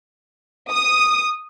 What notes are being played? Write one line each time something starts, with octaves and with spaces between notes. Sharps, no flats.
D#6